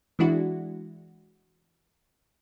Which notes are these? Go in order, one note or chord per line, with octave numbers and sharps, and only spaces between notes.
E3 G#3 D4 E4 F#4